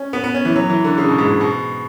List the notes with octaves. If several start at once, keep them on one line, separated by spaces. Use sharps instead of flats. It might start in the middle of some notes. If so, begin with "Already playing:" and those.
Already playing: C#4
B3
B3
C#4
E3
F#3
E3
D3
C#3
B2
G#2
B2